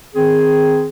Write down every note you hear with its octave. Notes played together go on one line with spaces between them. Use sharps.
D#3 C4 G#4